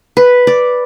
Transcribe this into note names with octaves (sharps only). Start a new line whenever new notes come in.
B4
D5